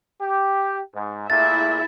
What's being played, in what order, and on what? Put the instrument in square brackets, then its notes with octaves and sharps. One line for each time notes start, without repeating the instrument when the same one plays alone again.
[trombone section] G4
G#2
[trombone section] A#2 A3 A#3 [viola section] E4 G#4 E5 [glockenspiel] A6